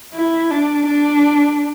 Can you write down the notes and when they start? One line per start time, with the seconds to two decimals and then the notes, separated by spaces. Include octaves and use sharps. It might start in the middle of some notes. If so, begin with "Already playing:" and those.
0.14 E4
0.51 D4
0.87 D4